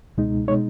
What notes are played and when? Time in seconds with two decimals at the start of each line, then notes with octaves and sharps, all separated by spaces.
0.18 C#2 B2 G#3 D#4
0.48 B2 G#3 D#4 C#5